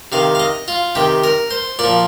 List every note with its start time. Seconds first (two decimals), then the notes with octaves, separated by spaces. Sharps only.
0.12 C3 D#3 F5
0.35 F5
0.40 D#5
0.68 F4
0.95 C3 D#3 G4
1.24 A#4
1.51 C5
1.79 A#2 F3 D5